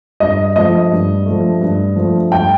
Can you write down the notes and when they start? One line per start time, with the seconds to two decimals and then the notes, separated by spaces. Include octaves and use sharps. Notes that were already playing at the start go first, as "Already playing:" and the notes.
0.20 G2 D#5
0.55 F3 A3 D#5
0.91 G2
1.26 F3 A3
1.61 G2
1.96 F3 A3
2.31 G2 G5